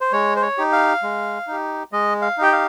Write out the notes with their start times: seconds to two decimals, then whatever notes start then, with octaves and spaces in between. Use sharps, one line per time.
0.01 C5
0.12 G#3 C#5
0.36 C5
0.42 C#5
0.58 D#4 G4
0.72 F5
1.02 G#3
1.47 D#4 G4
1.92 G#3 D#5
2.22 F5
2.38 D#4 G4 G5
2.53 F5